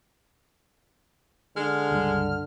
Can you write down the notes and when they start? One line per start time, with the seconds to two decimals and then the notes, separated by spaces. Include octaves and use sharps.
1.56 D3 G#3 F6
1.91 C#2 G2